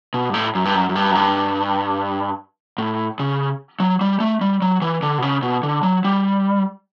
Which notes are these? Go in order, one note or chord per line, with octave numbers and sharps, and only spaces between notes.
B2
G2
A2
F#2
G2
F#2
F#2
G2
F#2
G2
A2
C#3
F#3
G3
A3
G3
F#3
E3
D3
B2
C#3
B2
D3
F#3
G3